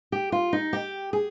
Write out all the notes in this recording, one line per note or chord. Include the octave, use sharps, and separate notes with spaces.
G4
F4
D#4
G4
G#4